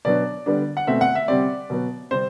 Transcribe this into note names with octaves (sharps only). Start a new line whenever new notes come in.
B2 F#3 B3 D4 D5
D3 G3 B3 D4
F#5
B2 A3 C4 E5
F#5
E5
C3 G3 C4 D5
B2 F#3 B3
C3 G3 C4 C5